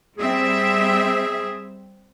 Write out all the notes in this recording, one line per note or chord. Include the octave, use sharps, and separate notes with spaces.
G3 C4 G#4 E5